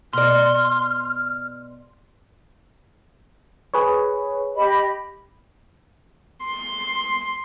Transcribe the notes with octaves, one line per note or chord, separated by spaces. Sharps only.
B2 D5 C6 F6
G#4 B4 C#5
G4 D#5 B5
C6